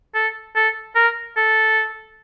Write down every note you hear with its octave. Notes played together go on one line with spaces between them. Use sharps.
A4
A4
A#4
A4